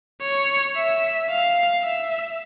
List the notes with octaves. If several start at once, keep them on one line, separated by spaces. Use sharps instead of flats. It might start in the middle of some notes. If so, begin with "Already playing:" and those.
C#5
E5
F5
E5